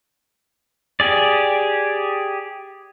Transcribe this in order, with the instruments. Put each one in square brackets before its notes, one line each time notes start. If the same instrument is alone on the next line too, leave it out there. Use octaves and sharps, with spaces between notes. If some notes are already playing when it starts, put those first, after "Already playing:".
[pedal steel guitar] G4 G#4 D5